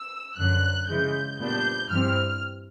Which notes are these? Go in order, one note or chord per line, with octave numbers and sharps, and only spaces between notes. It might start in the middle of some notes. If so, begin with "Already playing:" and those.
Already playing: E6
F#2 D3 F#3 F#6
C#3 E3 G#3 G6
A#2 G3 B3 D4 G6
G2 E3 G3 C4 F6